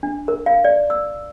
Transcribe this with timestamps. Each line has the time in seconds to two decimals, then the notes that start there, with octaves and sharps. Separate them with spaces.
0.03 D4
0.28 A#4
0.46 F5
0.64 D5
0.90 E6